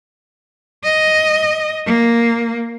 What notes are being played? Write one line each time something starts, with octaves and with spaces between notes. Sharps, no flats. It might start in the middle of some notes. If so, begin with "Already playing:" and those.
D#5
A#3